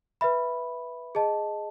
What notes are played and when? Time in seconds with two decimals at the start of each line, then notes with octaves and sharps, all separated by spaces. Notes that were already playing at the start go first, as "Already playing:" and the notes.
0.21 B4 E5 B5
1.15 G#4 D#5 A5